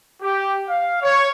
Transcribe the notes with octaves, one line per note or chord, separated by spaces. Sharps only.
G4
F5
C#5